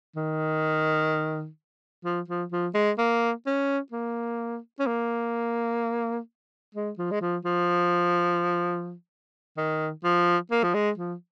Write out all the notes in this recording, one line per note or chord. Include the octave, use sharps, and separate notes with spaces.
D#3
F3
F3
F3
G#3
A#3
C#4
A#3
C#4
A#3
G#3
F3
G#3
F3
F3
D#3
F3
A#3
F3
G#3
F3